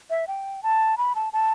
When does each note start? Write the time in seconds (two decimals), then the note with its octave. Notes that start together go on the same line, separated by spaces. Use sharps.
0.10 E5
0.28 G5
0.63 A5
0.98 B5
1.15 A5
1.33 A5